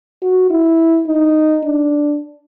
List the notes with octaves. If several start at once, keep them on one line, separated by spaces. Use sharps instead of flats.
F#4
E4
D#4
D4